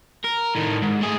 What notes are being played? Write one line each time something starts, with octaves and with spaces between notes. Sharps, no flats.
A#4
A2 D#3
G#2
A2 G#4